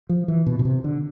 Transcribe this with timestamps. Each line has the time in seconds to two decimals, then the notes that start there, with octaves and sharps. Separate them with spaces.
0.09 F3
0.28 E3
0.46 B2
0.59 B2
0.65 C3
0.84 D3